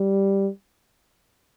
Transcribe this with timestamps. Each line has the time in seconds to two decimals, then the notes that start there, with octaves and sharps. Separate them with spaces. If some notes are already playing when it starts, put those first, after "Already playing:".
Already playing: G3